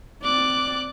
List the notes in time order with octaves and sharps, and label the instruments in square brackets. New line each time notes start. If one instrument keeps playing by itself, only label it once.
[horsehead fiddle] C4 D5 [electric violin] D6 F#6